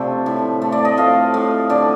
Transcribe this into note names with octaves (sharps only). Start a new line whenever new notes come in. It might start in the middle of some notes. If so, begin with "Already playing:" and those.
Already playing: C3 F3 A3 D4
A2
A3
D5
D#5
F3 F5
A2
D3 D5